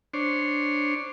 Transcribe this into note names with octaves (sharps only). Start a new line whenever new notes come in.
D4 C5 C#5